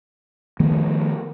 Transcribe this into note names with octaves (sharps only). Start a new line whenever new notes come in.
D#3 F3 A3 B3